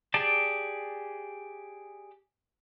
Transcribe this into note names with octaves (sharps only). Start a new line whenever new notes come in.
G4 G#4 D5 A5